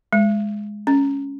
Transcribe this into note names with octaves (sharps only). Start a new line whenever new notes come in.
G#3
C#4